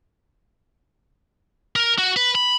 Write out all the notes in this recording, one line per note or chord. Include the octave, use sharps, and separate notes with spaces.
A#4
F#4
B4
B5